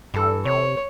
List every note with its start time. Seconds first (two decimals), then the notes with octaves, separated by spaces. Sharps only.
0.14 G2 E3 A4
0.45 C3 C#5